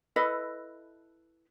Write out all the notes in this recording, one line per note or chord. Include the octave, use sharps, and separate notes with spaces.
E4 A4 B4 D#5